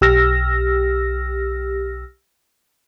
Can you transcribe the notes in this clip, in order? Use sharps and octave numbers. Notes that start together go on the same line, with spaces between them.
B1 G4 E6 F6 A#6